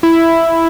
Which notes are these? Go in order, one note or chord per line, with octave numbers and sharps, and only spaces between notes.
E4